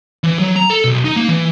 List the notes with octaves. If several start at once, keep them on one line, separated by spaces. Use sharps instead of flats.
E3
F#3
A#5
A4
B1
D#4
A#3
E3